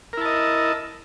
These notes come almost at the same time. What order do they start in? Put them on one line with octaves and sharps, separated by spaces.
A#4 E4 A5 D#5